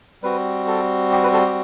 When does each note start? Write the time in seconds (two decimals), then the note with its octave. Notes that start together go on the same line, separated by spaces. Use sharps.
0.22 G3 C4 F#4 B4
0.67 A4
1.12 G4
1.24 B4
1.34 A4
1.46 G4